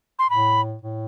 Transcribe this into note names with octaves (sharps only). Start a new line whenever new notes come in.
C6
A2 B5
A2